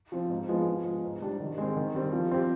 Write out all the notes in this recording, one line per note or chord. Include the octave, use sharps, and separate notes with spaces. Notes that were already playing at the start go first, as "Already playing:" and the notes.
F3 C4
G#2
F3 G#3 B3
F3
G#3 B3
G#2
G3 D4 G4
D#3
G#3 C4
D#3
G3 C4
F3
C4 G4